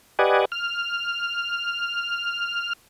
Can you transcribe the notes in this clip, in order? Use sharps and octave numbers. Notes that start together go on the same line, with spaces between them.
G4 B4 D5 D#5 F#5 G#5
F6